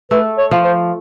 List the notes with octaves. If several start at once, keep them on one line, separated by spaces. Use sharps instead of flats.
A3 B4
C#5
F3
C5